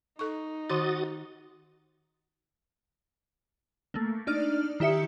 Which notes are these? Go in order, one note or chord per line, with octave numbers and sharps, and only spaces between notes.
D#4 A4 C#6
D#3 F#4 D6 D#6 A6
A3 A#3
D4 D#4 D5 F6
D#3 E4 G4 E5 C#7